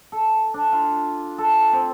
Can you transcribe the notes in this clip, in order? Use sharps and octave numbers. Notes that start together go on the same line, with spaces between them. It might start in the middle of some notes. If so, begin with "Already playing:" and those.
A4
D4
F4
A4
C4